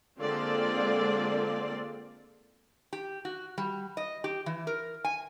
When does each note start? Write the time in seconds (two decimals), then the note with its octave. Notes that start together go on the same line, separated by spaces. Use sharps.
0.20 D3 G#3 A#3 C4 F4 D5
2.93 G4
3.25 F#4
3.58 G3
3.97 D#5
4.24 G4
4.46 E3
4.67 A#4
5.05 G#5